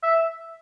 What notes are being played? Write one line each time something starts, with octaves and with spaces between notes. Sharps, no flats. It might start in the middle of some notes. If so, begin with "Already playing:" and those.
E5